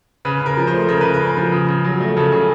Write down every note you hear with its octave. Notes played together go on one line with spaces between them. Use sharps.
C#3 B4
C#3
A#4
F3
C5
A3
C#3 A#4
C#3 B4
A#4
C#3
F3
C#3
C#3
F#3
A3
C#3 A4
C#3 G#4